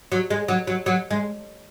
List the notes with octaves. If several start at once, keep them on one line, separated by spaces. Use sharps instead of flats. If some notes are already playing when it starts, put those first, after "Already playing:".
F#3
G#3
F#3
F#3
F#3
G#3